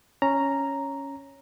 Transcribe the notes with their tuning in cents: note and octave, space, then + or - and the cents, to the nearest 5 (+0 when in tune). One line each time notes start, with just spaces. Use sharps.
C#4 +0 A#5 +0